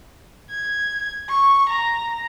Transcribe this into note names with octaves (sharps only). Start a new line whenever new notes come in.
G#6
C#6
A#5